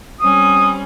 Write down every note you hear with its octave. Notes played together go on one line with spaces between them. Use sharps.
G3 C4 C#4 D#6